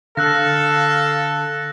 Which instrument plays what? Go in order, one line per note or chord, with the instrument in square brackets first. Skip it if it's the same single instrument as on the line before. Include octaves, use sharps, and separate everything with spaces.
[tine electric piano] D3 [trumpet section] A4 [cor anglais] F5 [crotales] E6 F#6 A#6